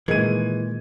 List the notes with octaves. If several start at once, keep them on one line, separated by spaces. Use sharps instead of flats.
A#2 D#3 E3 G#3 G#6 D#7